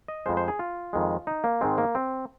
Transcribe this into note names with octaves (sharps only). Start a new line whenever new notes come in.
D#5
F2 F3 G#3 C5
C5
G#4
F4
F2 D#3 G#3
D#4
A#3
G#2 D#3 G#3 C4
A#3
C4